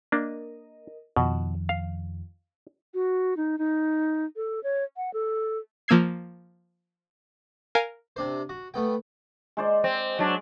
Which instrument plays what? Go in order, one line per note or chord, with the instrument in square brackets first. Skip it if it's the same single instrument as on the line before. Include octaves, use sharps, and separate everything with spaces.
[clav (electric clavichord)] A#3 D4 [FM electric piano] A#4 D#5
[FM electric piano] F2 D#3 F3 [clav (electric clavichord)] B2
[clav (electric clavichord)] F5
[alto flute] F#4
D#4
D#4
A4
C#5
F#5
A4
[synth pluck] F3 A#3 E6 G#6 C7
A#4 F5 G#5
[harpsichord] C3 D4 C5
F#4
A3 B3 G5
[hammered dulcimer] G#3 C5 D5
[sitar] C4
F#3 D4